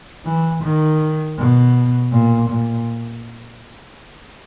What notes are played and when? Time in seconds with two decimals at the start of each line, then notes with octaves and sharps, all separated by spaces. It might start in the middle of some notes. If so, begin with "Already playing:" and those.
0.25 E3
0.63 D#3
1.38 B2
2.12 A#2
2.49 A#2